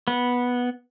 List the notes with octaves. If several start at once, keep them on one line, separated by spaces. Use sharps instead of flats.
B3